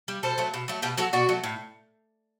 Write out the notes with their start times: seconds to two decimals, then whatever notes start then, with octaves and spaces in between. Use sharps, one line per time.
0.08 G3
0.23 B2 A4 C5
0.38 F#3 A3
0.54 B2
0.68 F#3 A3
0.82 B2 G4 B4
0.97 F#3 A3 F#4 A4
1.13 B2 D4 F#4
1.29 F#3 A3
1.44 A2